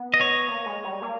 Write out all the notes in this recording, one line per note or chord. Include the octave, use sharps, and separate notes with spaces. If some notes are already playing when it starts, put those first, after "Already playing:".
Already playing: B3
D#5
C#5
A#3
G#3
G3
A#3